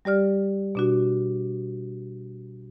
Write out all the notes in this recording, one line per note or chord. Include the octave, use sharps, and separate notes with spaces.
G3 G4 D5 F6
B2 D4 F#4